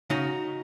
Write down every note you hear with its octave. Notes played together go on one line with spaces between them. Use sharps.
C#3 D#4 F#4